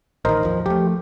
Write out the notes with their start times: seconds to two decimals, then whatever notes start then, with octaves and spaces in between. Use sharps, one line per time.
0.25 A1 D#3 A#4 C5 D#5
0.44 D#2 F3
0.66 F3 A3 G4